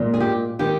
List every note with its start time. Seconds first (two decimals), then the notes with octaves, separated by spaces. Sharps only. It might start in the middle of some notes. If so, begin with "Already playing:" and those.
Already playing: A#2 G#3
0.14 G#4
0.20 G4
0.59 D#3 G#3 G4